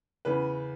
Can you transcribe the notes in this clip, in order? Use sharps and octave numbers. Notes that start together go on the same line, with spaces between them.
E2 C#3 E3 B4